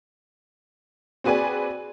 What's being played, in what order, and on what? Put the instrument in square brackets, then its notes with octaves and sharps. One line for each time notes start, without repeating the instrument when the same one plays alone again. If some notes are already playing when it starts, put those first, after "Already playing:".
[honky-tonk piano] C4 F#4 G#4 B4 D5 G#5